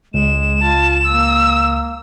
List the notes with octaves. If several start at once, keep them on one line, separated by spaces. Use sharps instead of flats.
C#2 G#3 E7
F4 A5
A#3 E6